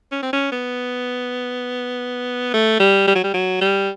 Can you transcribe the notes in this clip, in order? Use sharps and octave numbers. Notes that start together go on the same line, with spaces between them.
C#4
C4
C#4
B3
A3
G3
G3
F#3
G3
F#3
G3